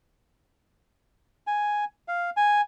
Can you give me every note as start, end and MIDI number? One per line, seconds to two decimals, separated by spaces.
1.47 1.85 80
2.08 2.30 77
2.37 2.61 80